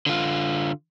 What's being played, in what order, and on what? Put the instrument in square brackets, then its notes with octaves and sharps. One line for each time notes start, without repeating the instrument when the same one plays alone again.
[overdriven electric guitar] D3 F4